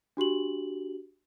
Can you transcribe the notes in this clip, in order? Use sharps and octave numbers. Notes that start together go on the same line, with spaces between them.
D4 F#4 G4 F#7